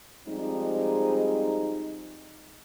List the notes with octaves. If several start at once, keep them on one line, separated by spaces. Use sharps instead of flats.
F3 G3 G#3 C4 D#4